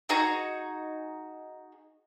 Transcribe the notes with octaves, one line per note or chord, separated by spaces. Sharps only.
D#4 F#4 G#4 A#5